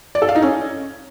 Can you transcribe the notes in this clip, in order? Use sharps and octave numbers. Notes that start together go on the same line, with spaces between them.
D5
A4
F5
D#4
C#4